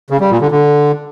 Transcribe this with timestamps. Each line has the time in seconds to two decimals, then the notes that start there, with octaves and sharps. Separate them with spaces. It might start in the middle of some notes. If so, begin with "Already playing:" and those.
0.10 C#3
0.21 G3
0.31 A#2
0.41 D3
0.51 D3